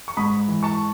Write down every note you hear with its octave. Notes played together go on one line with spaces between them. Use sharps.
C#6
G#2 B5 D#6
E3
A5 C#6